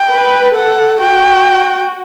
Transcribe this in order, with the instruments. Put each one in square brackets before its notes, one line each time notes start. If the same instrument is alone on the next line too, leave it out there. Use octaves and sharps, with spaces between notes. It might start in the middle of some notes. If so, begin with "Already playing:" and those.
Already playing: [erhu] G5
[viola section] B4
[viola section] A4 [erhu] F#5
[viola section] F#4 [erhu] G5